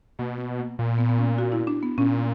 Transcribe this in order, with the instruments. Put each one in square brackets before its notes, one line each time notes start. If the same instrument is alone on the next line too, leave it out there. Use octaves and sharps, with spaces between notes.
[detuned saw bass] B2 [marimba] A#3
[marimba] B3
A#3
[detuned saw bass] A#2
[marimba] B3
B3
C#4
F#4
E4
D4
B3
[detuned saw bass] A#2 [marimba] C#4